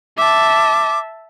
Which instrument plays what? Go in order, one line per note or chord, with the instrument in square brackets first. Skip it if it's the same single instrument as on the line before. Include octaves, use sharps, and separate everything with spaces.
[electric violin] E5 A5 [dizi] D6